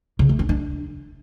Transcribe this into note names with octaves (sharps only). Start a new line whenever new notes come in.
C#3
A3
C#4
D4